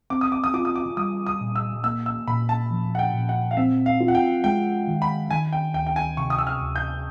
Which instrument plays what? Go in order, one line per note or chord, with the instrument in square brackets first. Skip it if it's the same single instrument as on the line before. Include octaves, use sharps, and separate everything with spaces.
[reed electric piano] C4 [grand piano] D6
[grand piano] D#6
D6
D#6
[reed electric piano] F4 [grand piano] D6
[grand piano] D#6
D6
[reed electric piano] G3 [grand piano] D#6
[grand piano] D#6
[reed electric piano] A#2
[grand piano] E6
[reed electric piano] A#3 [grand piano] E6
[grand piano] E6
[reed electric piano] A#2 [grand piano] B5
[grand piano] A5
[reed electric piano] F3
[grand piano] F#5
G5
[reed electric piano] A#2
[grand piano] F#5
F5
[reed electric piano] C4 [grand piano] E5
[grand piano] F5
[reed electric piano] F4
[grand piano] F#5
G5
[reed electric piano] G#3 [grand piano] G5
[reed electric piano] D#3
[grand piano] B5
[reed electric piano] D#3 [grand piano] G#5
[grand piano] G5
[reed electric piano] D2 [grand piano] G5
[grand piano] G5
G#5
[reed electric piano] C3 [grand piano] C#6
[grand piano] D#6
E6
F6
[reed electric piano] D2
[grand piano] G6